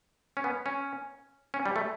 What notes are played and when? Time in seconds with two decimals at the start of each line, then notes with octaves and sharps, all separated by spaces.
0.37 C#4
0.44 B3
0.66 C#4
1.54 C#4
1.66 G3
1.76 A3